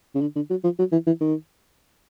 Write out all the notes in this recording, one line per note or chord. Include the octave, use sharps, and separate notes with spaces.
C#3
D3
D3
F#3
F3
F#3
E3
E3
D#3